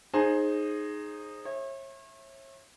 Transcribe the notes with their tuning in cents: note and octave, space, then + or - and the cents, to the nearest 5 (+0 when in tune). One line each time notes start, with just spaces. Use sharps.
D#4 -10 G#4 +10 C5 +25
C#5 -40 E5 +0